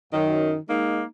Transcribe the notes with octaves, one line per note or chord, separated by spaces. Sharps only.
F#2 D#3
G#3 A#3 D#4